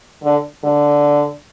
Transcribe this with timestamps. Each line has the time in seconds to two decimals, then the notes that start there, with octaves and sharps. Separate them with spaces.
0.23 D3
0.64 D3